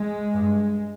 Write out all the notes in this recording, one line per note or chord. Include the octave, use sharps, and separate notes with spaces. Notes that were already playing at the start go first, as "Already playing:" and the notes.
Already playing: G#3
G2